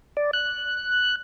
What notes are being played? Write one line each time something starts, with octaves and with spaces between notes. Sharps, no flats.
D5
F#6